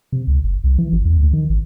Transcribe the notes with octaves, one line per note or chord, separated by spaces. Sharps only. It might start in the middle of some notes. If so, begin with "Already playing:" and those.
C3
C#2
F#1
C2
E3
G1
E2
D2
D#3
G#1